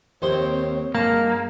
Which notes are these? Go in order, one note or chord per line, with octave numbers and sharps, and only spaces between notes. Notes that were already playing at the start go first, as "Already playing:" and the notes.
D#2 A#3 C4 C5 C#5 C6
G2 F#3 G#3 A#3 A5